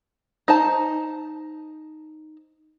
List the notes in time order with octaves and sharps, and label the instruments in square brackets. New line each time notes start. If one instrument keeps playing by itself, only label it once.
[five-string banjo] D#4 C5 A5